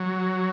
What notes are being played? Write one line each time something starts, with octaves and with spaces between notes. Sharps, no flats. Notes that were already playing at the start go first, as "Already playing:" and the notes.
Already playing: F#3